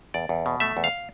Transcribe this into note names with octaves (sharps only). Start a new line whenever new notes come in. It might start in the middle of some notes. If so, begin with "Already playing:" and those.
E2 D5
E2
B2
A3 E5
E2
F5